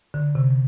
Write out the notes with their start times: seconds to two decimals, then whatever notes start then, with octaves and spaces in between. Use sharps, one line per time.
0.14 D3
0.35 C3